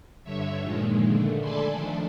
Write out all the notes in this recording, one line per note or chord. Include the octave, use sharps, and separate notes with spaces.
G2 D3 C#5 E5
A#2 D#3 F3 G#3
D3 A3
A4 D5 G#5 A5 B5 C6
D#3 F3 A3 D4